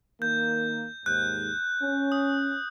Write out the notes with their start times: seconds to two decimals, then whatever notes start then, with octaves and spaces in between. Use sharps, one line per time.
0.22 D#3 A#3 G6
1.06 D#2 G#2 F#6 G6
1.82 C#4
2.12 D#6